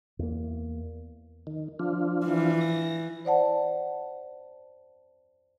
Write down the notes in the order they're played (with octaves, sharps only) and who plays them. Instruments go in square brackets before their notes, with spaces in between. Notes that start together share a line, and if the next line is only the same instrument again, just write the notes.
[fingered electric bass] E2 A#3
[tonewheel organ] D#3
F3 D4 F4
[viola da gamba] E3
[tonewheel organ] A#6
[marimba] C5 D5 F#5 A5